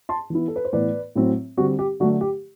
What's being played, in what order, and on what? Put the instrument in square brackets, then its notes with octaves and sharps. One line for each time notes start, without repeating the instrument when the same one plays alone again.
[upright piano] A5 C6
E3 B3 E4
A4
B4
C5
A2 E3 B3 B4 D5
A2 F#3 C4 E4
D3 G3 C4 F#4
G4
D3 F#3 A3 F#4
G4